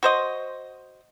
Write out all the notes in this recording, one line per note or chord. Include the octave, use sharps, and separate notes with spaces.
F#4 C5 D#5